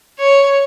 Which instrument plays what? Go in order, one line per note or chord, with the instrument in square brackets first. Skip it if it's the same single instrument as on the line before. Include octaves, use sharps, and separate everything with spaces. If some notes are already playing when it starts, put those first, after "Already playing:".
[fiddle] C#5